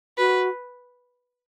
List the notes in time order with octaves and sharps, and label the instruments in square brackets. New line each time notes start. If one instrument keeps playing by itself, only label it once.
[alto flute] F#4 [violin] B4